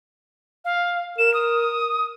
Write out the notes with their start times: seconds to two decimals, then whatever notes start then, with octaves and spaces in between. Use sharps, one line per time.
0.65 F5
1.18 A#4 E7
1.34 D#6